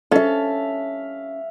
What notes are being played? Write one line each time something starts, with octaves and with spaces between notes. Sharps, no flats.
C#4 A4 E5 F5